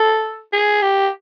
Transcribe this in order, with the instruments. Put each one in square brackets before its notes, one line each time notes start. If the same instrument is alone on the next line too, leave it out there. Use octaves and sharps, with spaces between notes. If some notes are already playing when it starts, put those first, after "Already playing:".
Already playing: [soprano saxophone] A4
G#4
G4